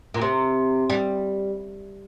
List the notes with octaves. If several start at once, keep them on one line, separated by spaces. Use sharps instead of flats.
A#2
C3
G3